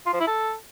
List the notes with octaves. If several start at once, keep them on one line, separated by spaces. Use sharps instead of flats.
F4
F3
E4
A4